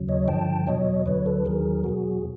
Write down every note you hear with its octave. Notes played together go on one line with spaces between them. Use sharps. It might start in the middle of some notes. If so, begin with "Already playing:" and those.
Already playing: D#2 C#3 F#3
C#5 D#5
G2 D3 F3 G5 A5
E2 B2 F#3 C#5 D#5
D2 D3 F#3 B4 C#5
A4 B4
D#2 D#3 F#3 G#4 A#4
E2 B2 F#3 F#4 G#4